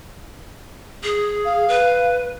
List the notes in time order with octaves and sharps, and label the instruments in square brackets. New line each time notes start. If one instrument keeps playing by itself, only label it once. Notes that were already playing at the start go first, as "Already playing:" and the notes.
[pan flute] G#4
[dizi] F5
[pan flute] B4